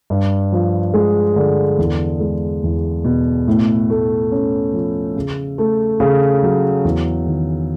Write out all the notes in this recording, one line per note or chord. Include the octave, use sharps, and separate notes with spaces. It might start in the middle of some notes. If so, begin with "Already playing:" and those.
G2
F3
G#3
D3
E2
G#3
E2
B2
A2
A3
C#4
F3
C#3
A3
C#3
F#3
E2
D#3